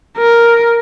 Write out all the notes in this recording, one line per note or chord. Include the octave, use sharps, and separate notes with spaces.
A#4